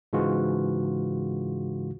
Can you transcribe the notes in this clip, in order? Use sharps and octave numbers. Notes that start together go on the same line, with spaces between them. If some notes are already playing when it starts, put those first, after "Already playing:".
G#2 C#3 E3 G#3 F4 F#4